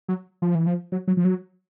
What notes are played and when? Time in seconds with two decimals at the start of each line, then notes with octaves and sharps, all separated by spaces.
0.09 F#3
0.42 F3
0.55 E3
0.67 F3
0.92 F#3
1.08 F#3
1.17 F3
1.24 F#3